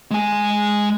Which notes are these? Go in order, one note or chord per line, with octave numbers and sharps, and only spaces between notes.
G#3 G#5